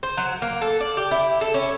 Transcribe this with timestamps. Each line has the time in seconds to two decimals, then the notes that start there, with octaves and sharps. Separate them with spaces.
0.03 C5
0.17 F#3
0.42 A#3
0.62 A4
0.80 D5
0.97 G4
1.11 E4
1.41 A4
1.54 C#4